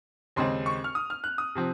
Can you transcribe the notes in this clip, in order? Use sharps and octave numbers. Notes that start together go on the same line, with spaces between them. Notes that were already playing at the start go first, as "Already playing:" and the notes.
D#2 C#3 G#3 C4 C6
C#6
F6
D#6
F6
F#6
D#6
C3 F3 C4